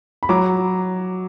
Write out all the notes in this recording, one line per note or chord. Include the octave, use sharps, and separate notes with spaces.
B5
F#3 A#5 D6